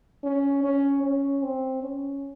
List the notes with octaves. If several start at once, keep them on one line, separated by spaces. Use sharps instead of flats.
C#4
C#4
C#4
C4
C#4